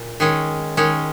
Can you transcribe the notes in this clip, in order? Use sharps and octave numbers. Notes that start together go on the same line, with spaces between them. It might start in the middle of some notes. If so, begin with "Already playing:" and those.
Already playing: A#2
D#3 G#3 C#4
D#3 G#3 C#4